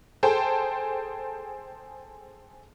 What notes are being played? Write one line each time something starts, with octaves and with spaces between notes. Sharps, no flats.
G#4 A4 C5 G5 A5